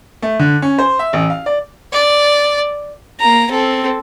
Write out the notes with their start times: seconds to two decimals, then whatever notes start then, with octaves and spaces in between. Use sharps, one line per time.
0.22 A3
0.39 D3
0.62 C#4
0.79 C5
0.99 E5
1.13 A1
1.30 F5
1.46 D5
1.92 D5
3.20 A#3 A#5
3.50 C4 A4